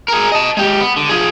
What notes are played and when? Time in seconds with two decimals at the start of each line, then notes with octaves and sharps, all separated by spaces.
0.08 G#4 A#4
0.32 D#5 A5
0.57 G#3 G4
0.80 B3
0.97 D3
1.09 F3 G#4